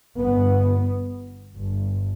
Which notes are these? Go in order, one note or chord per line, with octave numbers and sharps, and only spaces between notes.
G1 G2 B3
G1 G2